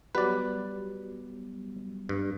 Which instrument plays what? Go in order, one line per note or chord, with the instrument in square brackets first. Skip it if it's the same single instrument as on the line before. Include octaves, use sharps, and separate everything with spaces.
[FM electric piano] F#3 G3 B3 [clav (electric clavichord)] B4 D5
[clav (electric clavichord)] G2